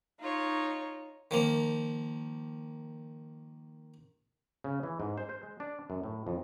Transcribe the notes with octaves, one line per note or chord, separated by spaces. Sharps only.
D#4 F4 C#5
D#3 F3 A#3
C#3
E3
G#2
C5
C5
G#3
D4
F#2
A2
F2